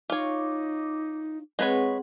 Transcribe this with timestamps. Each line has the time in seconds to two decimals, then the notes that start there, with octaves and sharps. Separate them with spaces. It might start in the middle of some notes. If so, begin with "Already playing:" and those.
0.10 D#4 F4 C#5 D6
1.59 G#3 C4 G#4 B4 C#5 F#5